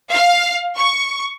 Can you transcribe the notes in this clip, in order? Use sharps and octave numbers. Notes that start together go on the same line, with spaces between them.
F5
C#6